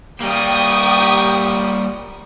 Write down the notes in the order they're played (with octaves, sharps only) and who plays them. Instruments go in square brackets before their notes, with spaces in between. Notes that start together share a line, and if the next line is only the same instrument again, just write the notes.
[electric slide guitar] G3 A#3 [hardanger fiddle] G4 C#6 [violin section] G5 D#6